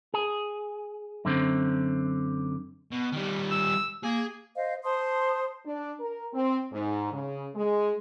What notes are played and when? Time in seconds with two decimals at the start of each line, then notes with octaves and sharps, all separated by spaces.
0.14 G#4
1.25 F#2 D3 C4
2.92 B2
3.13 D#3 G3
3.51 E6
4.04 A#3 G#4
4.56 C5 D#5 F5
4.84 C5 A5 C6 D#6
5.65 D4
6.00 A#4
6.33 C4
6.72 G#2
7.11 C#3
7.54 G#3